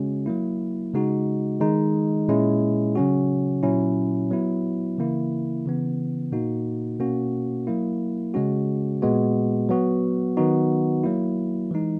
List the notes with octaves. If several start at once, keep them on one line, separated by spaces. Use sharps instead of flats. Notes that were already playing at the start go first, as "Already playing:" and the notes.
Already playing: C#3 G#3 C#4 F#4
F#3 A#3 E4
C#3 G#3 D#4 F#4
D#3 G#3 D#4
A#2 G#3 C#4 E4
C#3 F#3 C#4 F#4
A#2 F#3 C#4 E4
F#3 B3 E4
C#3 E3 A#3 E4
C#3 E3 B3
A#2 A#3 D#4 F#4
B2 A#3 C#4 F#4
F#3 A#3 E4
C#3 G#3 C#4 F#4
A#2 G#3 B3 F#4
F#3 B3 F#4
D#3 F#3 B3 D#4 F#4
F#3 A#3 E4
E3 G#3 D#4